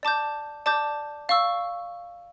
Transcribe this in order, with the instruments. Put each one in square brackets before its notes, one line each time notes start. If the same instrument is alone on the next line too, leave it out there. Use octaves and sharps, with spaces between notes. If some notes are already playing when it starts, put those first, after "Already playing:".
[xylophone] D5 A5 D6 G6
D5 A5 D6 G6
D5 F5 C#6 E6